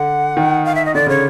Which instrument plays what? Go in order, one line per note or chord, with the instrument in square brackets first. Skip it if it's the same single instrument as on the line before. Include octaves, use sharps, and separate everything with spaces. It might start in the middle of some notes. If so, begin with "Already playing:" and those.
Already playing: [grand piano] D3 [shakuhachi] F#5
[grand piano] D#3
[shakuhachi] F5
E5
D#5
[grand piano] D3 [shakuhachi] D5
[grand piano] C#3 [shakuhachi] C#5